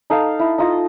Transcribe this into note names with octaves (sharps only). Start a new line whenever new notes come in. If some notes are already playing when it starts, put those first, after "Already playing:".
D#4 A4 F5
E4
D#4 F4 D#5